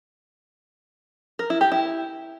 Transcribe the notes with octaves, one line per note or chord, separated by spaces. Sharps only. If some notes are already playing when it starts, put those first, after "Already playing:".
A#4
E4
G4
E4